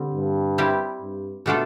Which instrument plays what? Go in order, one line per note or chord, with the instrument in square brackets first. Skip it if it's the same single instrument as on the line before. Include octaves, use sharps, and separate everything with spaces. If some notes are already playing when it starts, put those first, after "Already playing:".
Already playing: [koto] D3 G3 C4
[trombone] G2
[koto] G3 C4 E4 G4
[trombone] G2
[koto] B2 A3 D4 F4 A4